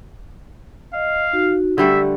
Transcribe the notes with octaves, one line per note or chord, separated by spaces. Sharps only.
D#5 F5
D#4 F#4
D3 G3 A3 G4 E5